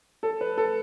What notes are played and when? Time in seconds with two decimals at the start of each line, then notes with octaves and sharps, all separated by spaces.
0.23 A4
0.41 B4
0.58 A4